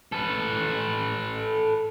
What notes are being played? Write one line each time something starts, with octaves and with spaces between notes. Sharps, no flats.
A4 B4